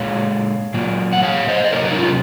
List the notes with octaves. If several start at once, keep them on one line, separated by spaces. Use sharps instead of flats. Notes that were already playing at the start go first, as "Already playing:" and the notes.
Already playing: A#2 G#3 C#5 F5
A#2 F#3 A#3
F#5
C#5 F5
C5 D#5
D#5
C3 F#3 A#3 A#4 C#5
A#4 C#5
D#4
C#4 F4